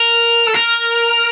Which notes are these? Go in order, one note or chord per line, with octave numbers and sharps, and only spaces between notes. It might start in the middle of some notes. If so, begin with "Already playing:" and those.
Already playing: A#4
A4
A#4